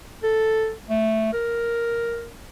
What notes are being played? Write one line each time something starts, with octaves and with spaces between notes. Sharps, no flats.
A4
A3
A#4